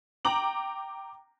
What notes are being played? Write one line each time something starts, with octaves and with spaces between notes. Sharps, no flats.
G5 A#5 D6 F#7